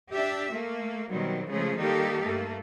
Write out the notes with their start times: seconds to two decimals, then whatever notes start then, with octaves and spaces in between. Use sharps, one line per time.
0.12 D4 G4 E5
0.52 A3 A#3
1.10 B2 D#3 F#3 G3 C4
1.48 C#3 F3 G#3 A3 G#4
1.78 D#3 G3 A#3 D#4 G4 A4
2.25 G2 A3 A#3